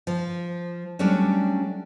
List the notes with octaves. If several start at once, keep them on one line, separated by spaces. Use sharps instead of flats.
F3
F#3 G3 A3 C#4 D4